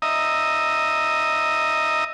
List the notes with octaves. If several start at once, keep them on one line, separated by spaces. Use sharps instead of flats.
D#5 E5 A#5 D#6